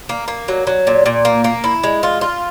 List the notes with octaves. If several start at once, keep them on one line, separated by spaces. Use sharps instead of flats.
A#3
A#3
F#3
F#3
A#2
A#2
A#3
A#3
E4
G#3
F4
F4